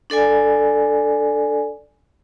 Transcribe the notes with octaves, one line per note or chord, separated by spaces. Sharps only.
D4 A4 D5 G#5